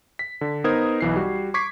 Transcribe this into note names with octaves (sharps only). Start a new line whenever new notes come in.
B6
D3
B3 D#4 A#4 C5 D#6 G#6
B1 E3 C7
G3 F#4
C#6 D6 G#6 B6 C7